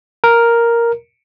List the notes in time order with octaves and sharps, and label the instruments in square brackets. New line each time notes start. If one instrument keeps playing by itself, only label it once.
[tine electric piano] A#4